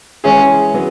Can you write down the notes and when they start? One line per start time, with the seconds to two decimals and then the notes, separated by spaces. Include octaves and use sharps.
0.24 E3 G#3 C#4 E4 G#4
0.74 F#3 B3